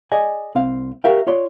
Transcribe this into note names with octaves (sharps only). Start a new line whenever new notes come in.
G#4 D5 D#5 G#5
C2 C4 F5
F#4 G4 A#4 E5 F5 G5
F4 C#5 D5 C6